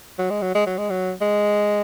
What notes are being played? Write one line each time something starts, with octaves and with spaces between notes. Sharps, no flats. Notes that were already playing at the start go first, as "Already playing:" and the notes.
F#3
G#3
F#3
G#3
F#3
G#3
F#3
G#3